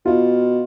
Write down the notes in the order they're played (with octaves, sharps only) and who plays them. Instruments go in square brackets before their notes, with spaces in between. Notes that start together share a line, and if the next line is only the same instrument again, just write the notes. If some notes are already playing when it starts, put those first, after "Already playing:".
[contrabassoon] B2 [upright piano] F4